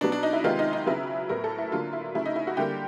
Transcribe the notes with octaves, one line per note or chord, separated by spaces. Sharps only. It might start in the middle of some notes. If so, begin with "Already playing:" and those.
B2 F#3 B3 D4
D4
D#4
E4
C3 D#3 G#3 B3 F4
D#4
D#4
C#3 F#3 B3 E4
A2 F#3 B3 A#4
A4
E4
D3 F#3 A#3 F4
E4
C#3 F#3 A3 E4
D#4
E4
F#4
D3 G3 A#3 G4